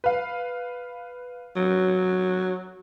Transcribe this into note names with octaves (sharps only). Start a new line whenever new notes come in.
B4 F5
F#3